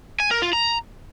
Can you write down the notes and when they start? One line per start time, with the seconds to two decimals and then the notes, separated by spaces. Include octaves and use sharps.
0.20 G#5
0.31 A#4
0.42 F4
0.53 A#5